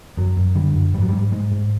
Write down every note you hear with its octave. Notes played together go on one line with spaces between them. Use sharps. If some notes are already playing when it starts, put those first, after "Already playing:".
F#2 F#3
F#2
D3 G3
F#2
G#2 G3
F#3
G#2 G3
G#2 G#3
G#2